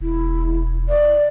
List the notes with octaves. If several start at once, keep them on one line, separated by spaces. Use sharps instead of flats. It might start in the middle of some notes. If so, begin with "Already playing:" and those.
E1 E4
D5